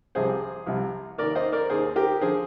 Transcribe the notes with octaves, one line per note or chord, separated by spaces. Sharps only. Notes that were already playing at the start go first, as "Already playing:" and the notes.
C2 C3 F3 G#4 C5
C2 C3 F3
D#2 D#3 A#4 D5
C5 D#5
A#4 D5
D#2 D#3 G#4 C5
G4 A#4
D3 F3 G#4 C5